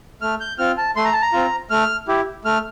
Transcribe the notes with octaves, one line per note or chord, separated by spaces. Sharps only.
A3 F6
G6
C4 F4 F6
A5
A3 C6
A#5
A5
A#5
C4 F4
A3 F6
E4 G4
A3 F6